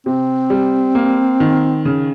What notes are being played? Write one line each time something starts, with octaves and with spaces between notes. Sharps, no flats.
C3 C4
G3
A#3
D#3
C#3